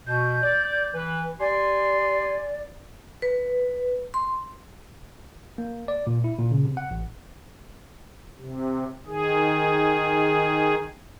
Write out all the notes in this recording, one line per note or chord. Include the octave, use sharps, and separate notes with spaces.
B2 G6
D5
E3 B4
G4 D5 G#5 C6
B4
C6
A#3
D5
A#2
E4
A#2
C#3
C3
F#5
A1
C3
D#3 G#4